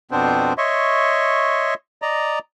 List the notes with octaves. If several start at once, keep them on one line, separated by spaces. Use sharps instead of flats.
F2 B2 B3 C4 D4 C5
C#5 D#5 E5 C6 C#6
D5 D#5 A#5